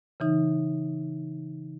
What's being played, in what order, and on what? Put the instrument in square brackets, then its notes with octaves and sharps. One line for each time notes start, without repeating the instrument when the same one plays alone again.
[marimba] C#3 E3 D#4